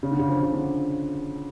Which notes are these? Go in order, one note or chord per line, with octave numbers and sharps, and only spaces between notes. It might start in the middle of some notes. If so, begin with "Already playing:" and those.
C#3
D3
C#3
F3
C#3
D3